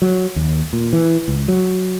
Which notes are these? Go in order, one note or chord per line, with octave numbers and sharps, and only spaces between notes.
F#3
D#2
A#2
E3
C#2
F#3